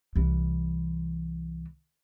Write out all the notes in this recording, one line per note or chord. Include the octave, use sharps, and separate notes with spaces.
C2 E3